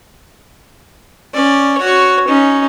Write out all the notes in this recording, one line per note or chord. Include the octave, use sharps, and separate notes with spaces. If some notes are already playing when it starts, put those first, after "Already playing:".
C#4 D5
F#4 C#5
C#4 D#4